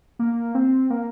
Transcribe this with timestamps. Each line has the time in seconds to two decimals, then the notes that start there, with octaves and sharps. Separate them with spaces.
0.19 A#3
0.55 C4
0.90 A#3